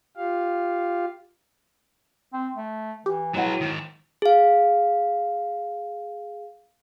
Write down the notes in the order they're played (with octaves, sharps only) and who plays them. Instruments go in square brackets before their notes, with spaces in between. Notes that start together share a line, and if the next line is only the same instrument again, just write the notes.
[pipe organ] F4 G4 F5
[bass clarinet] C4
A3
[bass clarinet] E3 [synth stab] G4
[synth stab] F2 G#3 F#4 [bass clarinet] A2 [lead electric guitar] F#3 B4
[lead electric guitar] G#2 D#3
[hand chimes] G#4 F5